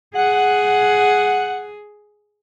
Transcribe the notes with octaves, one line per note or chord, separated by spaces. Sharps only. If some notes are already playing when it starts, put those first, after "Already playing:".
G#4 F#5